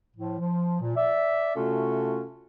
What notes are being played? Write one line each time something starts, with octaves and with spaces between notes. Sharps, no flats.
A2 F3
F3
A#2
D5 E5
C3 A3 C#4 F4 F#4 A4